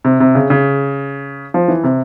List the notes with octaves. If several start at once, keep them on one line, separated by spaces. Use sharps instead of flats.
C3
C3
C#3
C#3
F3
E3
C3